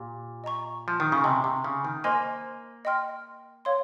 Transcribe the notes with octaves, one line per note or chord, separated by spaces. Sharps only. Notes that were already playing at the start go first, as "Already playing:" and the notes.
Already playing: A#2 G4
D#5 A#5 C#6
F3
D#3
C#3
C3 D#5 G#5 C#6
C3
C#3
D#3
A#3 C5 D#5 G#5 C6
D#5 G5 C6 F6
C#5 F5 C6